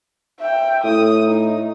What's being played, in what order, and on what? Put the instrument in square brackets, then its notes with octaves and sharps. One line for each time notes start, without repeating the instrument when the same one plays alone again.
[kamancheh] E5 G5
[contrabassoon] A2 [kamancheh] D#6
[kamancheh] D#4